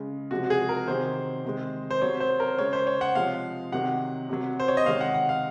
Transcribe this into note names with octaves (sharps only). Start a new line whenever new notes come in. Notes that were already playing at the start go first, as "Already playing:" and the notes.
Already playing: C#3 G#3
C3 F3 G#3 F#4
F#4
G#4
A#4
C3 D#3 F#3 C5
C3 D#3 G#3
C5
C3 F#3 C#5
C5
A#4
C#3 G#3 C#5
C5
C#5
F#5
C3 F3 G#3 F5
C3 D#3 F#3 F#5
C3 F#3
C5
C#5
D#5
C3 D#3 G#3 F5
F#5
F#5
F5